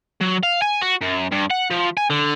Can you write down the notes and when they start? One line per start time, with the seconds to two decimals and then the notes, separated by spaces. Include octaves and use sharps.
0.21 F#3
0.43 F5
0.62 G#5
0.82 F#4
1.02 F#2
1.32 G2
1.51 F#5
1.71 F3
1.97 G#5
2.10 D3